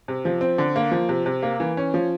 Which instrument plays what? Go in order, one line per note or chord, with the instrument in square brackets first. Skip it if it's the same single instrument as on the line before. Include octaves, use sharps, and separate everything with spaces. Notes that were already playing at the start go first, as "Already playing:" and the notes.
[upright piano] C3
F3
C4
D3
A#3
F3
C3
C3
A#3
E3
C#4
F3